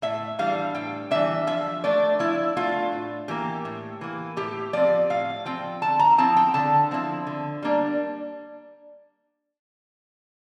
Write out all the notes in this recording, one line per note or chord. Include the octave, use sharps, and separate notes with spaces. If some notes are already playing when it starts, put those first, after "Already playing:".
A2 E5
E3 G3 D4 F5
A2 G5
E3 G3 D4 E5
F3 E5
A3 D4 D5
F3 E4
A3 D4 F4
A2
E3 A#3 G4
A2
E3 A#3
A2 G4
F3 C4 D5
A2 F5
F3 C4 G5
D3 A5
A#5
F3 C4 E4 A5
G5
D3 A5
F3 C4 E4
D3
G3 A#3 D4